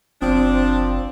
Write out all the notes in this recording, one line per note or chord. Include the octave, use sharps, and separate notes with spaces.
F#1 F3 C4 D4